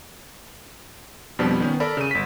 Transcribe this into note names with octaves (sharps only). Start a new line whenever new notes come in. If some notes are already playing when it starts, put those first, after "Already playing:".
F2 B2 F3 G3 B3 D4
D#3 B3 C#4
A4 A#4 D5 B5
C#3 D#7
G1 B6